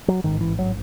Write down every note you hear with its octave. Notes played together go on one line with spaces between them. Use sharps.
F#3
A1 G#2 D#3
E3
F#3